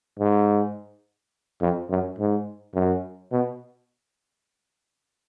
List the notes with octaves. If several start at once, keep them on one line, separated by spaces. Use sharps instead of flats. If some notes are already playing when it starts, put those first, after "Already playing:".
G#2
F2
F#2
G#2
F#2
B2